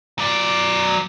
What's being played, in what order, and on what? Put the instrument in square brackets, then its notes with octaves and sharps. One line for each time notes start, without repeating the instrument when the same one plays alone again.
[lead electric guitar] F#3 D5